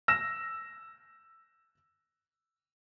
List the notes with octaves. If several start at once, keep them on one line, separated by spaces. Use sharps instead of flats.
E6 A#6 E7